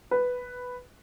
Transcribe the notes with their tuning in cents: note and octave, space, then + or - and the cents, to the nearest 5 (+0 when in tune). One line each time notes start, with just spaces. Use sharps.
B4 +5